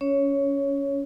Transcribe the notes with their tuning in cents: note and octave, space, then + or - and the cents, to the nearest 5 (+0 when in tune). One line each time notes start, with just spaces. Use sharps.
C#4 +20 C#5 +0